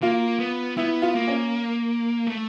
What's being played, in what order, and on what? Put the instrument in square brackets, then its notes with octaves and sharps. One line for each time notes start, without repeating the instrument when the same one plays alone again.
[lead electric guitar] A#3 [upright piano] F4
[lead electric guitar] B3
[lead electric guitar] B3 [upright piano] E4
[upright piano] F4
[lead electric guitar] A#3
[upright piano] C#4
[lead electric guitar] A3